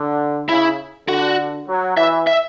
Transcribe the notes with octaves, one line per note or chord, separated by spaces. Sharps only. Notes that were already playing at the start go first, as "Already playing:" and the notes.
Already playing: D3
C#3 E4
D3 F#4
F#3
E3 E5
E5